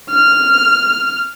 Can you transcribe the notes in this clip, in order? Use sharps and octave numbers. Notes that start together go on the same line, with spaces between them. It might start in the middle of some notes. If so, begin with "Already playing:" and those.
F6